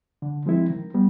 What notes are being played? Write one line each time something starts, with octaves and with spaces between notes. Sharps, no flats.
D3
F3 G#3 C4 E4
D#3
G3 B3